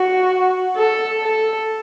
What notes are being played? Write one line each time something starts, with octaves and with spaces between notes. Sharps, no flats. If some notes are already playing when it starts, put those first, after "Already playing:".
Already playing: F#4
A4
A4